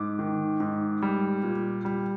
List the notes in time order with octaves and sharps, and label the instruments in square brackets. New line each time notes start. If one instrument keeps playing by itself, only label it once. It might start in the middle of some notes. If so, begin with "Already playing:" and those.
Already playing: [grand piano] G#2 D6
D#3
G#2
G3
A#2
G3